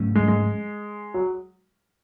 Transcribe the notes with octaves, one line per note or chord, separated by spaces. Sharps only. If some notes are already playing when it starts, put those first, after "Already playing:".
Already playing: G#2 F#3 A3 C#4
G#3
G#3
F#3